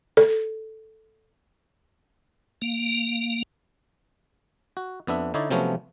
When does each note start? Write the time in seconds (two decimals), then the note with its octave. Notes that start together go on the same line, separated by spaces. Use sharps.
0.17 A4
2.62 A#3
4.77 F#4
5.07 F2 B3 D4 E5
5.34 D3 D#4 E4 C#5 D5
5.50 C3 F3 F#3 A3 B3 C#4